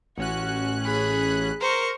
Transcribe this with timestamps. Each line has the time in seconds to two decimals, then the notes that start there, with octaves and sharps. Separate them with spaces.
0.18 A1 C#4 F#4 F#6
0.83 G#4 B5
1.61 A#4 C5 C#6